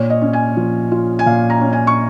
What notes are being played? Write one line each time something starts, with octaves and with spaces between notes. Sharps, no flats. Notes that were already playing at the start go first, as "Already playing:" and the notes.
Already playing: A#2 C#5
D#5
C#4
G#5
F3
F4
G#5
A#2 F5
A#5
C#4
G#5
C#6